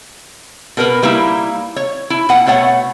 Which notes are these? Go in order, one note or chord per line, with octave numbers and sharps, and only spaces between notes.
B2 A#4 B4
G3 A#3 D#4 E4
C#5
E4
B2 F#5
B2 A3 C#5 F#5